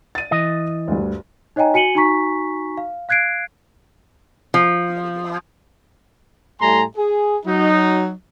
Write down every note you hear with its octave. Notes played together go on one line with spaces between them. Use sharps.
A6 D#7
E3 D#5
D2 G2
D#4 C#5 D#5 G5 G#5 A#5
F#4 G#5 C#7 D#7 F#7 G7
D#4 F#4 G#5 A#5 C#6 B6
F5
F5 F#6 G#6 C7 D7
F3
A2 G3 A3 G#5 A#5 C6
G#4
F#3 D#4